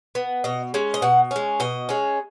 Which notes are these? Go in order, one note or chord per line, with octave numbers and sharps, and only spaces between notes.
B3
B2 D#5
G#3 C#4
D#5
B2 F#5
G#3 C#4
B2 D#5
G#3 C#4